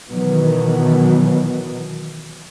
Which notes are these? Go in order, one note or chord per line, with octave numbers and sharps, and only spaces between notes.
B2 D#3 E3 F#3 B3